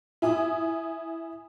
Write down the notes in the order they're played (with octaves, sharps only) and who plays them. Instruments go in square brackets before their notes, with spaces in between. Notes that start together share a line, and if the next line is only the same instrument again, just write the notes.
[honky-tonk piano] E4 G#5 D#6